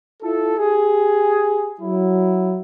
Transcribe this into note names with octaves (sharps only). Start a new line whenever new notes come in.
E4 F4 A4
G4 G#4
F#3 E4